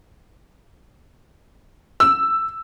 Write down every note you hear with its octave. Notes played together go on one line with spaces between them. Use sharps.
E6